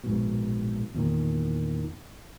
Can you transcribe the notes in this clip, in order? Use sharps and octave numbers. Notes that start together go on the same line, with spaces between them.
A#1 G#2 B2
E2 A#2 D#3